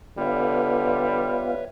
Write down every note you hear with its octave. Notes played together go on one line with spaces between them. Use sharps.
D3 G3 B3 F4 B4 C#5 E5